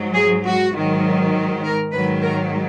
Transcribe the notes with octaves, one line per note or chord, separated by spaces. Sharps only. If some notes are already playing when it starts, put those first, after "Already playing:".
Already playing: G#2 F#3
G#4
F#4
G#2 D#3 F#3
A#4
G#2 D#3 F#3 B4
A#4